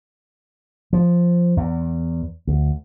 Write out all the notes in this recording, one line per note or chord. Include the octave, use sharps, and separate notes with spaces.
F3
E2
D2